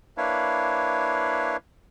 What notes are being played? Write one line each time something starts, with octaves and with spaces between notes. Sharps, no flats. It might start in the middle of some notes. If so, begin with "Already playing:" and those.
A#3 D4 E4 B4 C#5 F5